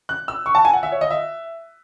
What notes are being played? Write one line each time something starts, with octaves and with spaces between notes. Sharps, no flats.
F#6
E6
C#6
A5
G#5
F#5
E5
C#5
D#5
E5